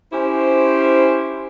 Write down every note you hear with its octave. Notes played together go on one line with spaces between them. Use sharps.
C#4 E4 G4 C5